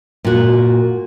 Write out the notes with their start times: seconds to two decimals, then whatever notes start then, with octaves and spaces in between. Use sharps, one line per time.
0.25 A#2 F#4